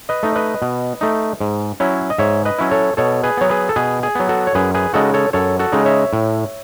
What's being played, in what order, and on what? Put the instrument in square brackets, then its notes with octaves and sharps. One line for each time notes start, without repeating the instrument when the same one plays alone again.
[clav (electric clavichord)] B4 D#5
A3 D#4
B4 D#5
B2
A3 D#4
G#2
F#3 C#4 E4
D#5
G#2 C#5 E5
B4 D#5
F#3 C#4 E4
A4 C#5
B2 A4 C#5
G#4 B4
F#3 B3 C#5
G#4 B4
A4
B2 G#4 B4
G#4
F#3 B3
F#4 A4
C#5
F#2 G#4 B4
G#4 B4
C#3 G#3 D#4 F#4 A4
A4 C#5
F#2 A4 C#5
F#4 A4
C#3 G#3 D#4
C#5 E5
A2